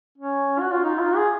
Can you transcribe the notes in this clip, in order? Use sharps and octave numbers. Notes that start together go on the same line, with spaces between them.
C#4
F#4
F4
D#4
F4
G#4